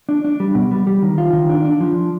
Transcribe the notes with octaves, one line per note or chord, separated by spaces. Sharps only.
D4
D4
G3
B2
G3
G3
D#3
F4
D#3
D4
D4
F3